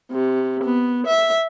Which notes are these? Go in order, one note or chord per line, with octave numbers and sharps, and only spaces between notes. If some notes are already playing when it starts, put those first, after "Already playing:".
C3
B3
E5